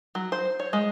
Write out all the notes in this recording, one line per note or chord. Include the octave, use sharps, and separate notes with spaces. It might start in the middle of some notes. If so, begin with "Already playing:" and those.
F#3
C5
C#5
G#3